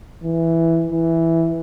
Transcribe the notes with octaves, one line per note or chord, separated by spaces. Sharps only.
E3
E3